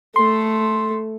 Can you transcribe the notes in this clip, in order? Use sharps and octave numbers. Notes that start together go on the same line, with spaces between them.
A3 A4 C6